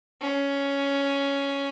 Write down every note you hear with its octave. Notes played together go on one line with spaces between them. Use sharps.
C#4